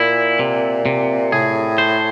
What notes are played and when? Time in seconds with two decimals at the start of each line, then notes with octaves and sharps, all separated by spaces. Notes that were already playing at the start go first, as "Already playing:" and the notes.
Already playing: A#2 E4
0.39 C3
0.86 C3
1.32 A2 G#4
1.78 C5